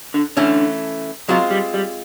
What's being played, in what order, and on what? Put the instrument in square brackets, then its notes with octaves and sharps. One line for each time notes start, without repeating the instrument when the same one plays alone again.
[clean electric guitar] D3
[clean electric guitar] D3 [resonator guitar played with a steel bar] E3 A3 C#4
[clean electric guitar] F#3 [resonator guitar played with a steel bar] G#3 C4 F4
[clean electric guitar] G3
G3